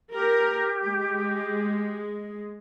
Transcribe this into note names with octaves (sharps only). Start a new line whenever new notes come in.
G4 A#4
G#3